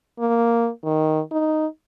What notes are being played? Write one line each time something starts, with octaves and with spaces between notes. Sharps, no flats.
A#3
D#3
D#4